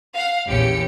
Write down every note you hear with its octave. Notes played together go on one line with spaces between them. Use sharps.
F5 F#5
A#1 E2 C#4 G4 C#7